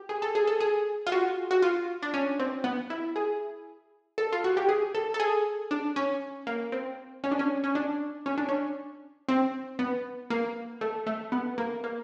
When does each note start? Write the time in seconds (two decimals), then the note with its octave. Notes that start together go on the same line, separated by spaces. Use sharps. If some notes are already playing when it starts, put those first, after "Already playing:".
Already playing: G4
0.09 G#4
0.22 A4
0.35 G#4
0.47 A4
0.60 G#4
1.07 F4
1.12 F#4
1.51 F#4
1.62 F4
2.02 D4
2.14 C#4
2.39 C4
2.64 B3
2.90 E4
3.16 G#4
4.18 A4
4.33 F4
4.44 F#4
4.57 G4
4.69 G#4
4.95 A4
5.14 A4
5.20 G#4
5.71 D4
5.96 C#4
6.47 A#3
6.72 C4
7.24 C#4
7.32 D4
7.39 C#4
7.64 C#4
7.75 D4
8.26 C#4
8.38 D4
8.49 C#4
9.29 C4
9.79 B3
10.30 A#3
10.81 A3
11.07 A3
11.32 B3
11.58 A#3
11.84 A#3